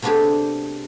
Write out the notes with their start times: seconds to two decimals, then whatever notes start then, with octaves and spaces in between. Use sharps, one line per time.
0.02 C3 A3 B3 D4 G4 G#4